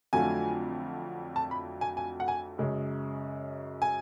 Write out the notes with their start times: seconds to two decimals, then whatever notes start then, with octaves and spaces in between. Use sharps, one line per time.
0.13 F2 D3 F#3 A3 F4 G#5
1.36 A5
1.51 B5
1.81 G#5
1.97 G#5
2.20 F#5
2.28 G#5
2.58 F#2 C#3 G#3
3.82 G#5